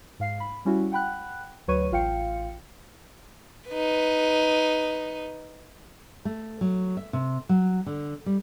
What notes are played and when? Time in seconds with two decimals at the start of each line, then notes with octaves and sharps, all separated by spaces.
0.20 G#2 F5 C7
0.40 B5
0.65 G3 C#4 E4 F#4
0.92 F#5 G5 B5 F#6
1.68 D2 F#3 B4 C#5 C#6 D#7
1.92 A1 F4 F5 G5 C#7
3.69 D#4 B4
6.25 A3
6.61 F#3
6.97 E5
7.13 C3
7.49 F#3
7.86 D3
8.26 G3